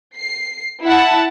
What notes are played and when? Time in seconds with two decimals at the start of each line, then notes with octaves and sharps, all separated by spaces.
0.17 C7
0.85 E4 F#5 A5